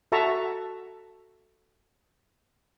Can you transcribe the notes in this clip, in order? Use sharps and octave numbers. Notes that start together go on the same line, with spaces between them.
F#4 A4 E5 A5 A#5 C#6